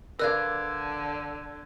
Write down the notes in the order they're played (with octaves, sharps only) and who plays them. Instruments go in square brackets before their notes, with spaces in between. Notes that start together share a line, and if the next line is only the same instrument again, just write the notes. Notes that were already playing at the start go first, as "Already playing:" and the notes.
[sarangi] D3 [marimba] A#4 [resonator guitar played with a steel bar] B4 D5 F5 [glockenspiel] E6 F#6 G#6